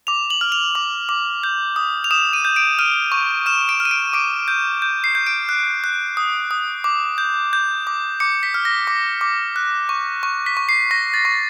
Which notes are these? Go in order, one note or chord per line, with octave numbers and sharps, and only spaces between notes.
D6 F7
F#7
F6
F7
D6
D6
G6
D#6
F7
D#6 E7
D#7
G6
D7
F6 D#7
C#6
F6 E7
D7
F6
D#7
D7
D6 D7
G6
G6
C7
G6
D7
F#6
F#6
D#6
D#6
D6
G6
G6
D6
D6 C#7
B6
F6
A#6
D6
D6
F#6
C#6
C#6
B6
C#6
C7
C#6 A#6
A6
C#6